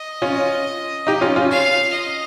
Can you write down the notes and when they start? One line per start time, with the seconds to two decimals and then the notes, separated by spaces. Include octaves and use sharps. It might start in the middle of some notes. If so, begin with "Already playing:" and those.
Already playing: D#5
0.22 C#4 F4
1.07 D#4 G4
1.21 C#4 F4
1.36 C#4 F4
1.50 F5
1.93 D#5